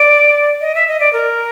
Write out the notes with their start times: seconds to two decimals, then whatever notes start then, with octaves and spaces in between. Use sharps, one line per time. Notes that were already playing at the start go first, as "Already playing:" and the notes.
Already playing: D5
0.61 D#5
0.75 E5
0.88 D#5
1.00 D5
1.13 A#4